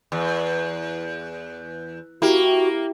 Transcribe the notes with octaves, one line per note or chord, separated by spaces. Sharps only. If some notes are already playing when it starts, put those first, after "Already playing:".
E2
A#3 E4 F#4 G4